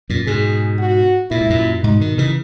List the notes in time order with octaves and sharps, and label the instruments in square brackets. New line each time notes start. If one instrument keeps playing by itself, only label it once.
[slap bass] F#2 A#2
[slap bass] G#2 B2 [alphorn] G#4
[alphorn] F#4
[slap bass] A#2 [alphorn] E4
[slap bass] G#2
F#2 A#2
[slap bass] G#2 B2 [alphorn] D#4
[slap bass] B2 D#3
C#3 E3